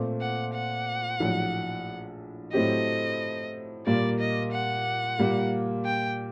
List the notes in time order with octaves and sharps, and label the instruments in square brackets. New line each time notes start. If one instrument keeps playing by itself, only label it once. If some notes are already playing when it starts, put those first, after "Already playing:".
Already playing: [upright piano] A#2 A3 C4
[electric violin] F#5
F#5
[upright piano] A#1 A2 F#3
[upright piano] A2 F#3 A3 C4 G4 [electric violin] D#5
[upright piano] A#2 G3 A#3 [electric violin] D5
[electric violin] D#5
F#5
[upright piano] A#2 G3 A#3
[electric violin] G5